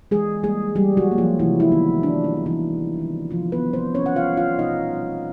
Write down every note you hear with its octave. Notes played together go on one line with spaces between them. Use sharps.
E3 G#3 G#4
G3 G#3 A#3 G#4
E3 G3 G4
F#3 F#4
G3 A#3
F3 F4
C3 E3 E4
E4
D#3 F#3 B3 D4 D#4
C3 D4
D#4
D#3 F#3 B3 D4
E3 E4
C3
D#3 G3 C4
C3 F3 F4
B3 B4
D#3 G3 C4
C4 C5
B2 C#4 C#5
F#5
F4 F5
G3 C4
F4 F5
B2 D#4 D#5
G3 C4